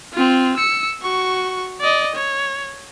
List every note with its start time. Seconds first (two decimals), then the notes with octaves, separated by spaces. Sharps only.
0.13 C4 F4
0.56 E6 C#7
1.02 F#4 C#6
1.81 D5 D#5
2.15 C#5